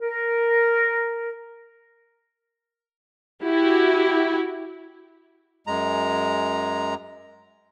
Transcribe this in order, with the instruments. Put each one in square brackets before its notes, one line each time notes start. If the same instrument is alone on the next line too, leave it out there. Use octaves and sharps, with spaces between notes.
[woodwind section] A#4
[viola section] E4 F#4 G4
[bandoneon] F#2 G#3 A#5